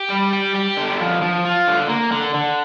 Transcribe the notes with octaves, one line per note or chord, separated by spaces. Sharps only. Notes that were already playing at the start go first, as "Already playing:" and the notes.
Already playing: G4
G3
G4
G4
D3
F3
F3
F4
D3
A#3
D3
D3